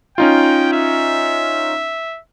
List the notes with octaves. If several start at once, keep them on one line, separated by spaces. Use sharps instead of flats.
C#4 D#4 F4 G5
E5